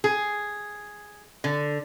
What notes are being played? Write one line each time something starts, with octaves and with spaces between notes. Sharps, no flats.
G#4
D3